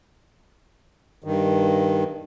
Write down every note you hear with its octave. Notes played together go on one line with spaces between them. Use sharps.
G2 D#3